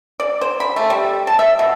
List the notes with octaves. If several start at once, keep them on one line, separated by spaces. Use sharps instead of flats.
D5
C5
B5
A3
G3
A5
E5
B2